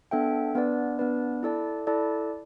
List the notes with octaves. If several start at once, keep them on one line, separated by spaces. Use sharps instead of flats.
B3 D4 A4 E5 G5
B3 D4 B4 D5
B3 D4 B4 D5
E4 A4 D5 A5
E4 A4 D5 A5